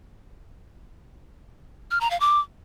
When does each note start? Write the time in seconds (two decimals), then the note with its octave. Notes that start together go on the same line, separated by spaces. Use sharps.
1.91 F6
2.01 A#5
2.10 F5
2.20 D6